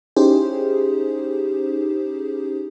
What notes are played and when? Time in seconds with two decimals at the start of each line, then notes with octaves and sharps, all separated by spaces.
0.16 C#4 D#4 E4 G4 G#4 C5